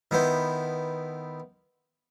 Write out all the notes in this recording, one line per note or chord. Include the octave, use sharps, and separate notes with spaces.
D#3 B3 E4 C5